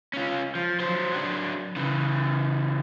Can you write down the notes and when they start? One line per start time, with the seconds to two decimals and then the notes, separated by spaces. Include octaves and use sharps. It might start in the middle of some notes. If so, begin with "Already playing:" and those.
0.13 C#4 F4
0.55 F3
0.80 F#3 C5
1.12 F#3 D4
1.76 C#3 E3